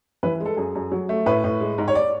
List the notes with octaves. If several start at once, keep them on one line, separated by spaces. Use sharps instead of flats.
E3 B4
G#3
A4
F#2 G#4
F#2
F#3
A3
A2 B4
A2
G#3
G#2
C#5
D5